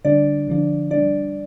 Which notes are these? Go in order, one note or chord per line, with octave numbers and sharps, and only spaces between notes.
D3 G3 D4 D5
D3 F3 D4
G3 D4 D5